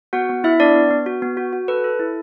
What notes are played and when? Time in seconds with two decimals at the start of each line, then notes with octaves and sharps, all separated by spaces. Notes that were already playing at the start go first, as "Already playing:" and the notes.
0.13 B3 F#4 F#5
0.29 B3
0.44 B3 E4 E5
0.60 B3 D4 D5
0.75 B3
0.91 B3
1.06 F#4
1.22 B3
1.37 F#4
1.53 F#4
1.68 A4 B4
1.84 A4
2.00 E4